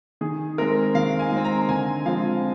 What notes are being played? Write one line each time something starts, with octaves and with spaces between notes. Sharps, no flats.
D#3 G#4
G#3 C4 A#4
D#3 F5
G#5
G#3 C4
A#5
A#5
D3 G#5
F3 G#3 C4 F5